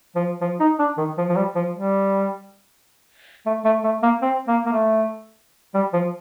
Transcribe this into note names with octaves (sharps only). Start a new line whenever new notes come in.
F3
F3
D#4
D4
D#3
F3
F3
G3
F3
G3
A3
A3
A3
A#3
C4
A#3
A#3
A3
G3
F3